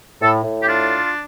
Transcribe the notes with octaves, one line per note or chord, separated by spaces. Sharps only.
A2 A4
A2
G4
D4 F4